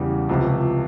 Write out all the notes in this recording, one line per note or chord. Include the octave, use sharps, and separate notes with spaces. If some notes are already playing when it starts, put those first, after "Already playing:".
Already playing: E2 C#3 E3 G3
C#2 C3 F3